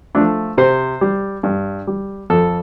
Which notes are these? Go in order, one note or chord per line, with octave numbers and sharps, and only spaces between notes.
F3 A3 D4
C3 C5
G3
G2
G3
F2 A4